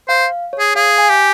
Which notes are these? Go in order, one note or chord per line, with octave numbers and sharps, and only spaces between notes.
C5 F5
C#5
G#4
G#4 F5
G#5
G4